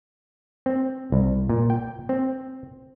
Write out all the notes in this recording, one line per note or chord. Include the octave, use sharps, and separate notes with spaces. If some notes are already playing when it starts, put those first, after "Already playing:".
C4
C2
A#2
G5
C4